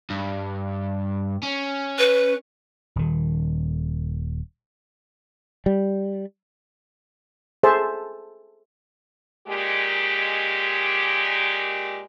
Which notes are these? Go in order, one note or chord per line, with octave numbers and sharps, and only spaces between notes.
G2
C#4
B4
D#1 D#3
G3
G#4 A4 C5 E5 A5
A#2 G#3 G4